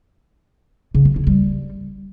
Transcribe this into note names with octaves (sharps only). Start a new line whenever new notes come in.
C#3
F#3
E4
G3